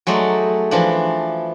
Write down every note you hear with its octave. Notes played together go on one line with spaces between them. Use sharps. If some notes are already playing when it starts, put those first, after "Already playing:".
F#3 G#3 A3 D#4 D5
E3 F3 D4